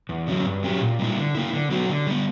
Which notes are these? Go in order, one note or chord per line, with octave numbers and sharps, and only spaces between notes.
E2
D3 F#3 C#4
G2
F#3 C#4 G4
A#2
G3 A#3 E4
D3
A#3 E4
D3
F#3 B3 F#4
D3
G3 B3